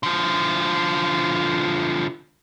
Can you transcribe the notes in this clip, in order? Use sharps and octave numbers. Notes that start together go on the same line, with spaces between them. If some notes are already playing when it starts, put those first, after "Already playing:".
D3 F3